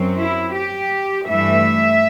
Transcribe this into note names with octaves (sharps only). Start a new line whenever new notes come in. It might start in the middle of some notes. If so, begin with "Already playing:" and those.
Already playing: F#2 F#3 C4
E4
G4
G2 E3 A3 E5